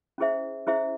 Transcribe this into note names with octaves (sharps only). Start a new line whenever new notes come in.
C#4 E4 G#4 C5 E5
C#4 E4 G#4 C5 E5